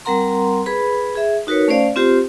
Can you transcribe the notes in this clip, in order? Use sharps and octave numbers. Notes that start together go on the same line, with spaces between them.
G3 C4 A#4 F#5 A#5 C6
G#4 B4 B5
G#4 E5
D#4 F#4 A#4 B4 C#5
A3 C#4 C5 D5 F5
C4 F4 G4 C5